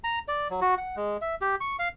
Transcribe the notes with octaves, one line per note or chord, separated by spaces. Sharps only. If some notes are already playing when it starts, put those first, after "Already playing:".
A#5
D5
F#3
F#4
F#5
G#3
E5
G4
C#6
F5